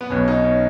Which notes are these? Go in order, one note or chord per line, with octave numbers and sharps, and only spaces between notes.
B3
B1 B2 C#4
D#4
C#4